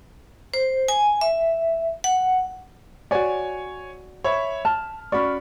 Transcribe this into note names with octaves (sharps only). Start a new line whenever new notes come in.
C5
G#5
E5
F#5
F#4 C#5 D5 G#5
C#5 E5 B5
A5 F6
C#4 F#4 D5 B5 C#6